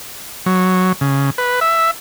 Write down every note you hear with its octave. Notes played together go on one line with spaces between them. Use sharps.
F#3
C#3
B4
E5